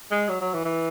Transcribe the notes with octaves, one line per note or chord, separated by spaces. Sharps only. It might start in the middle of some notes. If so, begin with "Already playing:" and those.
G#3
F#3
F#3
E3
E3